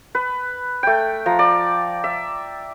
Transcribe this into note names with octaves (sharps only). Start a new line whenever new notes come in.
B4
A3 G5
F3 A#5
D5
E5